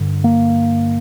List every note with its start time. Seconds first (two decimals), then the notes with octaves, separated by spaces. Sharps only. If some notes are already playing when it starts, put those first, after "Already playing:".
Already playing: G2 D3
0.24 A#3